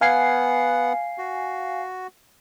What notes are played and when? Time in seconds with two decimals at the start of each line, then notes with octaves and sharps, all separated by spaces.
0.01 B3 F5 F#5 G#5 C7
1.18 F#4